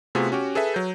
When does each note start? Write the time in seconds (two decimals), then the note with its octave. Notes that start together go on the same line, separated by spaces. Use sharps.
0.15 C3 A3 B3 F4 F#4 G#4
0.32 C#4 F#4 G4
0.55 G#4 A4 B4 E5
0.74 F#3 G6